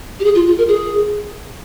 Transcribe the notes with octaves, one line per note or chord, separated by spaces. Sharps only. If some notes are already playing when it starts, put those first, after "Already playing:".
G4
G#4
F4
F4
A#4
G#4